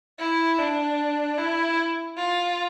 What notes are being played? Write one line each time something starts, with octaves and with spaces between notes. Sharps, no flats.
E4
D4
E4
F4